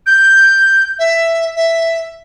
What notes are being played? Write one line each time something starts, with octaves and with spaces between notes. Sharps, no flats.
G6
E5
E5